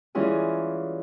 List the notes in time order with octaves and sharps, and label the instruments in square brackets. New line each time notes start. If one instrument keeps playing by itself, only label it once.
[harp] E3 G3 C#4 E4 F4 G#4